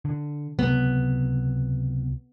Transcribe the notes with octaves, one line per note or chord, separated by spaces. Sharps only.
D3
C#2 C3 F#3 B3